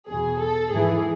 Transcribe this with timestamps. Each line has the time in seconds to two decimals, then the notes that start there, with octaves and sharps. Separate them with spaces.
0.08 E2 B2 G#4
0.40 A4
0.71 G#2 E3 G#4